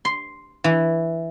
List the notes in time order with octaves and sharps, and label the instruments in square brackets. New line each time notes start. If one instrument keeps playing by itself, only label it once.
[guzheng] C6
E3